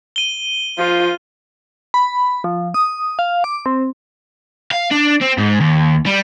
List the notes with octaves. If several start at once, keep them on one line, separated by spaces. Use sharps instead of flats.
D#7 G7
F3 F4
B5
F3
D#6
F5
D6
C4
F5
D4
C4
G#2
D#2
G3